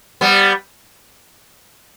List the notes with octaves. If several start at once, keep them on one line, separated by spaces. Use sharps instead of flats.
G3 B3